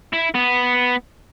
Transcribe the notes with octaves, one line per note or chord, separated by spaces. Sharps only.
E4
B3